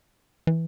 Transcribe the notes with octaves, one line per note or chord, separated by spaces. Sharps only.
E3